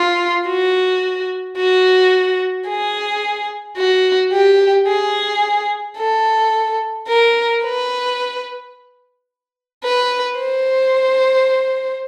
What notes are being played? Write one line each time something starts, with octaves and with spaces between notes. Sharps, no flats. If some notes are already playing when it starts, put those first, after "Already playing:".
Already playing: F4
F#4
F#4
G#4
F#4
G4
G#4
A4
A#4
B4
B4
C5